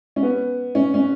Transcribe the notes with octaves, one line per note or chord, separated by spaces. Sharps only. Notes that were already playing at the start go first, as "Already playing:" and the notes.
C#4
B3
C#4
C#4